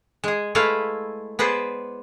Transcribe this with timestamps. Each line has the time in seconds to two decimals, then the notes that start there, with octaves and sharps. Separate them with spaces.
0.24 G#3 G#4
0.55 G#3 A3 E4 A4 B4 F5
1.39 B3 G#4 B4 C5 D5